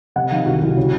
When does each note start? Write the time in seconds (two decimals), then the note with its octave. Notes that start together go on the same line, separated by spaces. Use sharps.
0.16 C3 F#5
0.31 D#3 F5
0.46 C2 F#4
0.61 C2
0.77 C#3